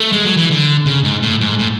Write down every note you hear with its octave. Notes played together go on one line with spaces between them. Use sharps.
A3
G#3
F#3
E3
D3
C#3
G#2
A2
G#2
A2